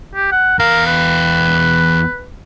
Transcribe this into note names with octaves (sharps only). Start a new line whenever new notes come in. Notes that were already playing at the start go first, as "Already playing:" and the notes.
G4
F#5
E2 A#4 F5
B4